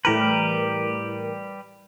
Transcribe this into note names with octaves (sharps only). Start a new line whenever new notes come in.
A2 E3 G3 G4 A#4 B4